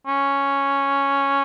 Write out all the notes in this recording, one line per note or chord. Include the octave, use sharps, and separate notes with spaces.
C#4